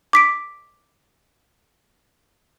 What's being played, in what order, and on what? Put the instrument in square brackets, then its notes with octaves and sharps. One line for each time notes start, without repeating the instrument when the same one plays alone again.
[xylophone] D6 B6 D7